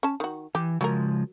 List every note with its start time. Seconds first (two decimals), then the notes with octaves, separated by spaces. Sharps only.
0.03 C#4 A5
0.20 D#3 F#4
0.55 E3 G4
0.81 C#3 F3 F#3 G#3 G4 A#4